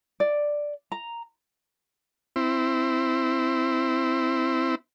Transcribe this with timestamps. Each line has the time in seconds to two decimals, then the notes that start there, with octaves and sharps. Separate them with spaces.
0.20 D5
0.92 A#5
2.36 C4 E4